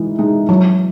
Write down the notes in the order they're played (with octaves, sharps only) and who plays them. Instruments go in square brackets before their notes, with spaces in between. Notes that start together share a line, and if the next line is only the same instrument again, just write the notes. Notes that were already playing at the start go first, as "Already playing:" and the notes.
Already playing: [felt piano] E3 G#3 D#4
G#3 D#4
[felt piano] E3 [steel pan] F#3